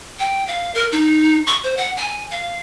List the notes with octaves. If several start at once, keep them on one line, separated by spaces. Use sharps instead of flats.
G5
F5
A#4
D#4
C#6
C5
F#5
G#5
F5